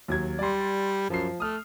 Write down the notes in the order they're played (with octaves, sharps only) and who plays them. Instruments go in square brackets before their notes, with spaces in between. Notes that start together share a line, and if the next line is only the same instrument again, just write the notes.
[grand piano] D#2 F#3 G#6
[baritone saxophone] G3 [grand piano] D5 C6
[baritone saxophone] F#2 [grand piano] F3 C7
[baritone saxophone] A3 [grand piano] D#6 F6